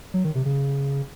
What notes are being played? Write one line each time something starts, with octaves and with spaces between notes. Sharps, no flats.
F#3
D#3
C3
C#3